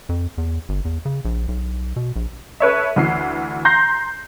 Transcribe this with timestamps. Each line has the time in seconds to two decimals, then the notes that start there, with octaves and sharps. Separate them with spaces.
0.09 F2
0.38 E2
0.69 G1
0.85 E2
1.05 C#3
1.25 A#1
1.48 B1
1.96 B2
2.16 A#1
2.60 A4 B4 C#5 E5
2.96 D2 E3 C7
3.65 A#5 C6 G6 A#6 C7